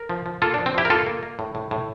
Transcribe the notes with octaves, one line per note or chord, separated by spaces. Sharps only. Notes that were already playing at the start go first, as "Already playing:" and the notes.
Already playing: A#4
F3
F3
A#3 F4 A4
F3 D4
C4
F3 E4 G4
A#4
A#3 F4 A4
A#3
A#3
A2
A2
A2